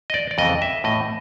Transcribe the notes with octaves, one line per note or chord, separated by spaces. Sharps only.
D#5
D5
D5
F2 C#3 E3 D#5
E5
A2 E3 D#5